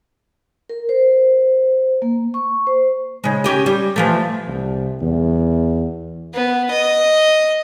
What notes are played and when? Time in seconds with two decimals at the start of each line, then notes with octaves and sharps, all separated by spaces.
0.69 A#4
0.89 C5
2.02 A#3
2.34 C#6
2.67 C5
3.24 C#3 G#3
3.44 C#4 G4 D#5
3.66 G3
3.96 E3 F3 A3
4.48 C2
5.02 E2
6.34 B3
6.71 D#5